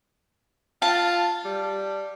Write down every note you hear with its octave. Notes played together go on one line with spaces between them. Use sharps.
F4 A5
G3